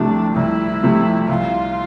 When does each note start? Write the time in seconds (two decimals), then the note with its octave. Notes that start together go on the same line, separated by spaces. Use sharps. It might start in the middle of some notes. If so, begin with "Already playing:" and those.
Already playing: C2 C3 F3 A3 D4
0.36 C2 E4
0.83 C3 F3 A3
1.28 C2 F4